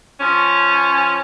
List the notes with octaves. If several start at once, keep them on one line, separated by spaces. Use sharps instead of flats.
F3 C#4